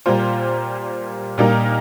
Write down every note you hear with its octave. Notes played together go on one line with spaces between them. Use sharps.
A#2 G3 A#3 F4 C5
A#2 G3 A#3 D#4 A#4